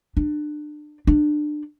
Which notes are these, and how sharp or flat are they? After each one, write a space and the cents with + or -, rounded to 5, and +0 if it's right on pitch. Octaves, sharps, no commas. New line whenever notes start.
D4 +30
D4 +25